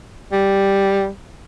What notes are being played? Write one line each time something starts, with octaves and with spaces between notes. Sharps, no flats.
G3